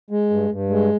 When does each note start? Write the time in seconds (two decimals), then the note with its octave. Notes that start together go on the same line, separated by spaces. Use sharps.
0.11 G#3
0.30 G2
0.50 G2
0.70 G#3